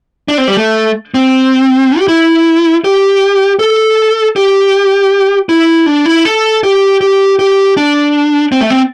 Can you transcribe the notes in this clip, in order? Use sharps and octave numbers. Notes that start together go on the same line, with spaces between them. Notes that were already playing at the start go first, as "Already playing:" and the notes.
D4
C4
G3
A3
C4
G4
E4
G4
A4
G4
E4
D4
E4
A4
G4
G4
G4
D4
C4
A3
C4